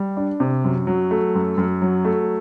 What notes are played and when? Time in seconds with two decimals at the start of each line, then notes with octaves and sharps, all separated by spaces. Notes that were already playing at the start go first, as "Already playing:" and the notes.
Already playing: G3
0.17 D4
0.40 C3
0.64 F#2
0.87 F#3
1.11 A3
1.35 F#2
1.58 F#2
1.82 F#3
2.05 A3